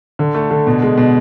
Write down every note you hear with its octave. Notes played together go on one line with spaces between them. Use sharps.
D3
A3
D3
B2
G#3
B2